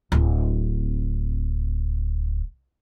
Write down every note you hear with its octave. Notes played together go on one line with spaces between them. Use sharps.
D1 C4